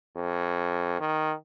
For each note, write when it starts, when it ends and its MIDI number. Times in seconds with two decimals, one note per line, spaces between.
0.16 0.98 41
1.00 1.34 51